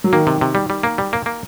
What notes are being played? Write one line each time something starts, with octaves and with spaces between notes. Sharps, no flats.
F#3
D#3 A#3
C3
C3
G3
G3
A#3
G3
A#3
A#3